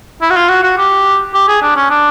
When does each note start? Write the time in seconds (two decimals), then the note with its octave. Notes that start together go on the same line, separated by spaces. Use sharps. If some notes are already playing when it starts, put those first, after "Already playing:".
0.22 E4
0.30 F#4
0.36 F4
0.49 F#4
0.63 F#4
0.78 G4
1.34 G4
1.48 G#4
1.62 D4
1.76 C#4
1.90 D4